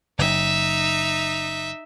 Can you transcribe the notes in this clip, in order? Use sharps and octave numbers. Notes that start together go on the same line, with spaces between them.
F#1 D#4 E5